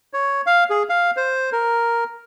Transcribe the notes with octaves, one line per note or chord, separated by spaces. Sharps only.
C#5
F5
G#4
F5
C5
A#4